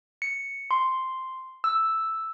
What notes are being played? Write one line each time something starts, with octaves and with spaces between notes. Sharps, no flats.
C#7
C6
E6